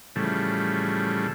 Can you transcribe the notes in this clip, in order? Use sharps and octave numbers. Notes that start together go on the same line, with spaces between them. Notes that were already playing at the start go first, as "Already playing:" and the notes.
A2 C#3 E3 F3 G3 A3